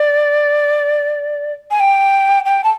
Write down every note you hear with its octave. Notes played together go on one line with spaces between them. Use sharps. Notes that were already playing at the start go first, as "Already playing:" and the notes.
Already playing: D5
G#5
G5
G5
A5